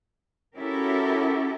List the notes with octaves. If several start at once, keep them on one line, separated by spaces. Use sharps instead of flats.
C#4 E4 F#4 G4 A4 A#4